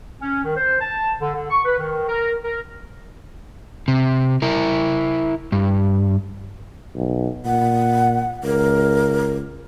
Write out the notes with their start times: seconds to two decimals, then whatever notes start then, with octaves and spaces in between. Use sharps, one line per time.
0.21 C#4
0.44 D#3
0.57 C5
0.80 A5
1.20 D3
1.34 D3
1.49 C#6
1.65 B4
1.79 D#3
2.09 A#4
2.44 A#4
3.88 C3
4.42 E4 A#4
5.52 G2
6.96 B1
7.46 A#2 F#5
8.43 C#2 A#4